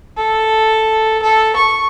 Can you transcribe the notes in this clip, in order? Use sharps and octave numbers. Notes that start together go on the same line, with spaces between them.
A4
A4
C#6